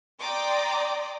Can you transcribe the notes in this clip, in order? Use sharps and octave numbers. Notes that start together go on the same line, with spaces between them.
D5 G5 A#5 C6 D6 D#6